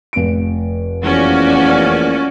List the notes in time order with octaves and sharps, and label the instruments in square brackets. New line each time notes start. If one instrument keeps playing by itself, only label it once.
[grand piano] F1 D7
[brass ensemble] E2 F3 A#3 [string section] C#4 F#4 D5